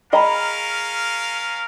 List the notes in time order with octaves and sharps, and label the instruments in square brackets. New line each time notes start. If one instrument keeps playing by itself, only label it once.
[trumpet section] C#4 A#4 F5 [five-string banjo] G#4 D#5 [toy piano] G5 A#5 B5